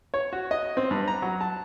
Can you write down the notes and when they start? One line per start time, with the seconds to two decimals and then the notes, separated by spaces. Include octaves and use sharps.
0.14 C#5
0.33 F#4
0.51 D#5
0.77 C4
0.91 G2
1.08 A#5
1.22 F#3
1.41 A5